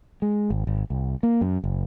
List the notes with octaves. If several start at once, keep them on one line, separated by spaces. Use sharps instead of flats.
G#3
G#1
G#1
C2
A#3
F#2
F#1